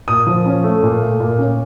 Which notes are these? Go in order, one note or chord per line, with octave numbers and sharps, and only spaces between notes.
A#2 D#6
F3
C#4
A3
A#2
A3
A#2
C#4